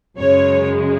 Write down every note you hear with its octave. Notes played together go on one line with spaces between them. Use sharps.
F#2 C#3 G#3 C#5